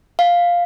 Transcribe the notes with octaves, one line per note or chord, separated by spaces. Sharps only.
F5